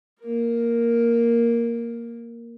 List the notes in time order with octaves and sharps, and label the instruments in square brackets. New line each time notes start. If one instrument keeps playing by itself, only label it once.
[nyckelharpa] A#3 A#4